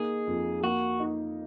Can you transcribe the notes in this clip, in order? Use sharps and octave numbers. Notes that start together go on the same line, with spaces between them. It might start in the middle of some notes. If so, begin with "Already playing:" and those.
Already playing: A#3 D#4 G#4
F2
A#3 F#4
D#4